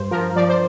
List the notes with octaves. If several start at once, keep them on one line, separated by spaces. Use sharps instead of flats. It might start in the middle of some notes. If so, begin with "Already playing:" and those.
Already playing: G2 C5
F3 A#4
F3 D5
C5